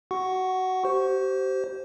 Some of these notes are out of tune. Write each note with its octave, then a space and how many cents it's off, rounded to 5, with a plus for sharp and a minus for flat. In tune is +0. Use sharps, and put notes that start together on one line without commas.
F#4 +20 F#5 +10 C#6 +0
G4 -35 C5 +0